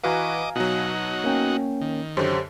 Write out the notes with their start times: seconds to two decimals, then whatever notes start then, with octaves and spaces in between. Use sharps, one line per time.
0.04 E3 F#4 B4 D#5 F5 G#5 A#5 D6
0.56 B2 F#3 D#4 F#4
1.24 A#3 C#4 G5
1.81 D#3
2.17 F#2 D3 G4 C5 C#5